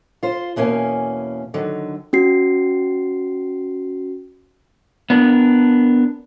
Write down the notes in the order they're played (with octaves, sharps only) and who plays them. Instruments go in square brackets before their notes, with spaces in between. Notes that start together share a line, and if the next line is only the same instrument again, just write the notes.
[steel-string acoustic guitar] F4 C5
E2 B2 A#3 C#4 G#5
D3 D#3 F#3
[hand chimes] C#4 F#4 C7
[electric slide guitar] B3 D4 A#4